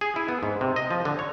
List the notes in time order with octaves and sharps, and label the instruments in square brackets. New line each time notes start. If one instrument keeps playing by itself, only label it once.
[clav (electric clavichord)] G#4
E4
B3
G#2
C3
D#5
F3
D3
C#5